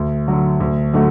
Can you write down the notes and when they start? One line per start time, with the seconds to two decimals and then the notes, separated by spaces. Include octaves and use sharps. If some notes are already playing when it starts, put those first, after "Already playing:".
Already playing: D2
0.27 D3 F#3
0.60 D2
0.93 D3 F#3 A3 F#4